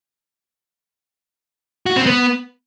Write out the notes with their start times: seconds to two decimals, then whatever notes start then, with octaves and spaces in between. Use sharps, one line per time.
1.86 F#4
1.96 C4
2.06 B3